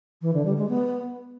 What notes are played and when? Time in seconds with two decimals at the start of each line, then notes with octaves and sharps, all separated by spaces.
0.22 E3
0.34 D3
0.46 G3
0.57 G#3
0.69 B3